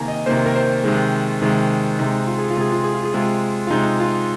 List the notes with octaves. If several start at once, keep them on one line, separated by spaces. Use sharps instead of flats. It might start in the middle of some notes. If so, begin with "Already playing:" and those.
Already playing: C3 D#3 A#3 G#5 A#5
D#5
C3 D#3 A#3 C5
A#4
C5
C3 D#3 G#3
C3 D#3 G#3
C3 G#3 D#4
F4
G#4
F4
C3 G#3 G#4
F4
G#4
F4
G#4
C3 G#3 F4
F4
C3 G#3 D#4
F4